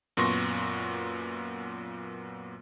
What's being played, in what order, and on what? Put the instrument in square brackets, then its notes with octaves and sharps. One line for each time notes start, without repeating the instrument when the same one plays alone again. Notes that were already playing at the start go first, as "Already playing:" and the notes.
[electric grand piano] F#2 A#2 B3 C6 C#6 A#6